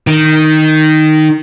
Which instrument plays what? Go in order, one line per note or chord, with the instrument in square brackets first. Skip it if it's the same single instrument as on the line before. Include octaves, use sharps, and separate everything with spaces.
[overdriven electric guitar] D#3